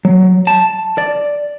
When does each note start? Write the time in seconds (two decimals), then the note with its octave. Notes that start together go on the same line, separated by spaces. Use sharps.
0.05 F#3
0.47 A5
0.98 D5